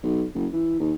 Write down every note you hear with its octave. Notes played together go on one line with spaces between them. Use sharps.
B1
F#1
E3
D#2